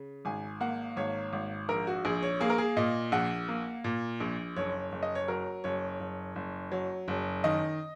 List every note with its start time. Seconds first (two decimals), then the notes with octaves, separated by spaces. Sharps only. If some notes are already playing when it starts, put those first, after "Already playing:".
Already playing: C#3
0.25 G#1 G#5
0.61 A#3 F#5
0.96 G#1 C#5
1.33 G#1
1.69 A#1 A#4
1.87 F#4
2.05 A#1 G#4
2.23 C#5
2.41 A#3 G#4
2.50 A#4
2.58 G#4
2.77 A#2 D#5
3.12 A#1 F#5
3.48 A#3
3.84 A#2
4.20 A#1
4.56 F#1 C#5
4.92 F#1
5.03 D#5
5.15 C#5
5.28 F#3 A#4
5.64 F#1 C#5
6.00 F#1
6.36 F#1
6.72 F#3
7.08 F#1
7.44 D#3 D#5